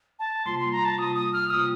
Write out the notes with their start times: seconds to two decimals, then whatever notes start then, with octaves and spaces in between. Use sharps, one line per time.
0.19 A5
0.45 C3 G3 A#3 F4 C6
0.59 C6
0.72 A#5
0.85 A5
0.98 C3 G3 A#3 F4 D#6
1.16 D#6
1.33 F6
1.50 C3 G3 A#3 F4 D#6